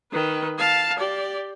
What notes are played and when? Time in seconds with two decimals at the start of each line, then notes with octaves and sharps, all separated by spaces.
0.12 D#3 B4
0.58 F5 A5
0.99 G4 D5